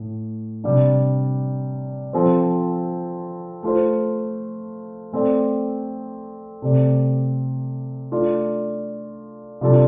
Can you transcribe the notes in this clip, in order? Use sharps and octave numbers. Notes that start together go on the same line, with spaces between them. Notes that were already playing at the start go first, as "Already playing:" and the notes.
Already playing: A2
C3 G3 D4
F3 C4 A4 C5
A3 F4 C5
A3 C4 A4 D5
C3 A3 C4 A4 D5
A3 D4 F4 D5
C3 G3 D4 F4 A4